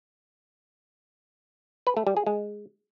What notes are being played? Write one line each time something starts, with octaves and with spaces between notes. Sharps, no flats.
B4
A3
G3
G#4
G#3